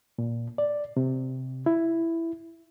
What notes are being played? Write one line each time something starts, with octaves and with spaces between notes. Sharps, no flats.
A#2
D5
C3
E4